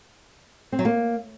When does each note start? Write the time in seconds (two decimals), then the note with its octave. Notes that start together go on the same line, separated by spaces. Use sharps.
0.72 C4
0.79 F#3
0.85 A#3